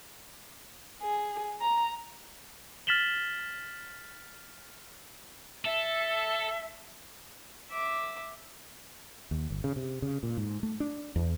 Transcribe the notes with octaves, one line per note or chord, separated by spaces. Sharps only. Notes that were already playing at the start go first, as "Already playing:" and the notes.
G#4
A#5
F6 A6 B6 E7 F#7 G7
A4 E5
E5 D6
D#2
G1
C#3
C3
C#3
A#2
G#2
A3
D4
E2